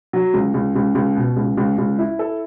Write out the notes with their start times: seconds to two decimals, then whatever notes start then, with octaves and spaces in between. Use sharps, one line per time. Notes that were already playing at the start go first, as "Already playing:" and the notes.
0.13 F#3
0.34 C#2
0.54 C#2
0.76 C#2
0.95 C#2
1.16 B2
1.37 C#2
1.57 C#2
1.78 C#2
1.99 E4
2.19 A4